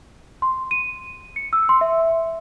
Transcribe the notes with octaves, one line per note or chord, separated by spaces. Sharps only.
C6
D#7
C#7
E6
C6
E5